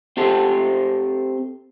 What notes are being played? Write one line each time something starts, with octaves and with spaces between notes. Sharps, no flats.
C4 G4 A4 C5